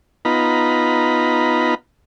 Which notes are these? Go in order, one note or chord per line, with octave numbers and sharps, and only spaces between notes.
B3 D#4 F4 A#5 B5